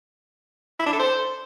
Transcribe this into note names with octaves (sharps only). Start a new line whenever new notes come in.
E4
D4
A4
C5